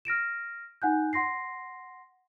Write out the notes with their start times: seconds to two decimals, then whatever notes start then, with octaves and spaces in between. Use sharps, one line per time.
0.05 F6 A#6 D7 E7
0.82 D#4 F#5 G#5 F#6 G6
1.13 F#5 C6 A#6 C7